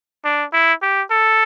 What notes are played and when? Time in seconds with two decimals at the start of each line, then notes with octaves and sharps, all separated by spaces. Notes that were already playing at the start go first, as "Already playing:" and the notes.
0.24 D4
0.53 E4
0.82 G4
1.11 A4